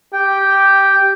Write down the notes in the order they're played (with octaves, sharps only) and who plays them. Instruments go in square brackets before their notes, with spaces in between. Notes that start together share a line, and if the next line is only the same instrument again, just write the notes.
[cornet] G4 [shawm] G5